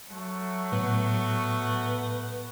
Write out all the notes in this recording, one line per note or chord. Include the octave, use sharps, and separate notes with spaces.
F#3 A3 F#4
A2 B3